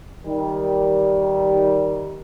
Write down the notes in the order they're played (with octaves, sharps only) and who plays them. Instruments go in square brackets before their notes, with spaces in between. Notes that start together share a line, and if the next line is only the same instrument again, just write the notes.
[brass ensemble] D#3 G3